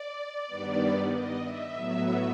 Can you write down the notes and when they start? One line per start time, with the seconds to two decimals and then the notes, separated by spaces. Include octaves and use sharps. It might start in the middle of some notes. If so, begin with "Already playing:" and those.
Already playing: D5
0.47 G2 D#3 G3 B3
1.10 D#5
1.41 E5
1.72 A2 F#3 B3